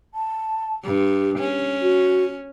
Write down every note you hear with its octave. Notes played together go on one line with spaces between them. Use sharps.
A5
G2 G4
C#4
F#4